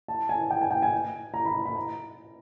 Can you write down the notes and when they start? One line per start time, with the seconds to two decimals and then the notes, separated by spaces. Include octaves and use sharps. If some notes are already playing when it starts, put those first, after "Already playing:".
0.08 A5
0.29 G#5
0.50 G5
0.61 G#5
0.71 G5
0.82 G#5
1.34 A#5
1.45 B5
1.65 B5
1.76 A#5